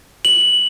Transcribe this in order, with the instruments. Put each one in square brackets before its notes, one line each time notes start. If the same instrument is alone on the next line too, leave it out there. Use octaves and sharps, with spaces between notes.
[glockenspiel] F#7